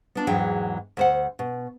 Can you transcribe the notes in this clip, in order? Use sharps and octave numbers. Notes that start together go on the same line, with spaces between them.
B3 D4 F4
E2 G#2 E3 F#3 G5
D2 C5 F#5
B2